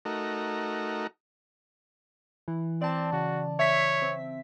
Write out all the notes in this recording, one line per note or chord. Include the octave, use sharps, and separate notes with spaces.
A3 D#4 F#4 A#4
E3
C4 D5 A5
C#3 F#4
C#5 E5 B6
C4